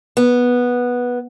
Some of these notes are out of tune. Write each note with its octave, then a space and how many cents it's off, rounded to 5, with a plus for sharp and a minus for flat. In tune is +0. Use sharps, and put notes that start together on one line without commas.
B3 -10